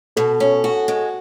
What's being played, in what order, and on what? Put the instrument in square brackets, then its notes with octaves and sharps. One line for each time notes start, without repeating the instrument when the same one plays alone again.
[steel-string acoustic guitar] B2 [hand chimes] A4
[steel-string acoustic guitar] C#4
F#4
G#3